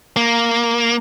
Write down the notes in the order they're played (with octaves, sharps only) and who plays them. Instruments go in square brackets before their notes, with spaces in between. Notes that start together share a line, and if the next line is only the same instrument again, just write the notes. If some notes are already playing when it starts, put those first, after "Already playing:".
[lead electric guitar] A#3